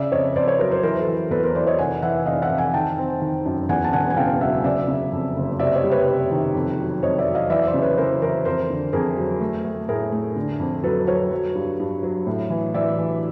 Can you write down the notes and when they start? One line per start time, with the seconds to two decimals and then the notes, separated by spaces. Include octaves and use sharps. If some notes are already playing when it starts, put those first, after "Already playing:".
Already playing: C#3 D5 E5
0.12 F2 C#5 D#5
0.35 F2 C5 D5
0.47 B4 C#5
0.59 F#3 A#4 C5
0.71 A#4 C5
0.83 E3 A#4 C5
0.99 A4 B4
1.07 E3
1.31 E2 A4 B4
1.43 A#4 C5
1.55 E3 C5 D5
1.67 C#5 D#5
1.78 F1 F#5 G#5
2.02 E3 E5 F#5
2.26 F1 D#5 F5
2.42 E5 F#5
2.50 F2
2.58 F#5 G#5
2.74 D#3 G5 A5
2.98 C4
3.22 D#3
3.46 F#2
3.69 E2 F#5 G#5
3.84 A5
3.93 E1 F#5 G#5
4.10 G#5
4.17 C#3 F5 G5
4.41 F#3 E5 F#5
4.64 C#3 D5 E5
4.88 C#3
5.12 F2
5.36 F#1
5.59 C3 D5 E5
5.75 C#5 D#5
5.84 G3
5.91 B4 C#5
6.08 C3
6.31 D#3
6.55 F2
6.79 F#3
7.03 F2 C#5 D#5
7.18 D5 E5
7.26 F#3
7.34 D#5 F5
7.50 E3 D5 E5
7.66 C5 D5
7.74 C#3
7.82 B4 C#5
7.97 E3 A#4 C5
8.22 E3 A#4 C5
8.45 F2 A#4 C5
8.70 D3
8.93 F2 G#4 A#4
9.17 F#3
9.41 A3
9.65 A3
9.88 A2 G#4 A#4
10.12 A3
10.36 D3
10.60 F2
10.83 F#3 A4 B4
11.07 F#3 B4 C#5
11.32 F#3
11.55 G2
11.80 G2
12.03 F#3
12.27 A2
12.50 E3
12.74 E3 D5 E5
12.98 E3